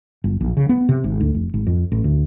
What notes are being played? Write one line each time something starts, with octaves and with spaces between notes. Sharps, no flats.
G1
A#1
C#3
B3
C3
G#1
D2
F1
G#1
F2
A1
D2